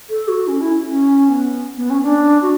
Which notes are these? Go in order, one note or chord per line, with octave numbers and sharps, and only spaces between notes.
A4
F#4
C#4
E4
C#4
C#4
B3
B3
C#4
D4
F#4